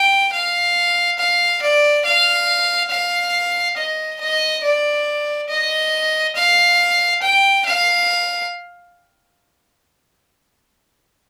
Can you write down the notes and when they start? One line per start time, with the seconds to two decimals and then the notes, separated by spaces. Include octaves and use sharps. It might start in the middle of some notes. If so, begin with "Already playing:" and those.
Already playing: G5
0.32 F5
1.18 F5
1.62 D5
2.05 F5
2.90 F5
3.77 D#5
4.20 D#5
4.63 D5
5.49 D#5
6.36 F5
7.22 G5
7.65 F5